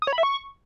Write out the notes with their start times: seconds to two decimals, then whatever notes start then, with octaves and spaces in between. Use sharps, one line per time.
0.02 D#6
0.07 C#5
0.13 B5
0.18 E5
0.23 C#6